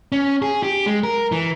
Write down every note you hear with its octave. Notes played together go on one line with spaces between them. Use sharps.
C#4
G#4
G4
G#3
A#4
E3